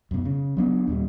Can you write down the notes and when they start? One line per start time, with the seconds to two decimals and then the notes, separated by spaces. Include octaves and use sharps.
0.11 F#2 B2
0.25 C#3
0.57 F#3 B3 D4
0.87 D#2 A#2 G3